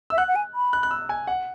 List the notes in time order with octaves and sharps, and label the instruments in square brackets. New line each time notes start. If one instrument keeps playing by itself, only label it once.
[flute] E5 [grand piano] E6
[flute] F#5 [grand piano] F#6
[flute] F#5
G#5
B5
[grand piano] F#6
F#6
E6
G#5
F#5